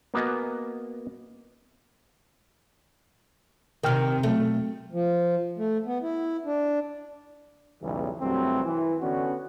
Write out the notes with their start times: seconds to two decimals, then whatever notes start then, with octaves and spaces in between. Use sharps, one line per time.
0.14 A#3 B3 F#4 D#5 G#5
3.83 C3 D#3 A#4 G5 F6
4.23 B2 F#3 A3
4.93 F3
5.58 A3
5.86 B3
6.02 E4
6.45 D4
7.81 B1 E2 C#3 E3 G3 G#3
8.21 C2 G2 F#3 A3 C4
8.65 E3
9.01 D3 B3 C#4 D4 F#4